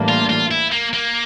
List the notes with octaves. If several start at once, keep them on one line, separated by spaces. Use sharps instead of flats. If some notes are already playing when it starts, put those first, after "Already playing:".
Already playing: A2 E3 G3 A#3 D4
F4
F4
E4
A#3
A#3